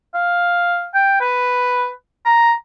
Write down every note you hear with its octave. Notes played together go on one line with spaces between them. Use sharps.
F5
G5
B4
A#5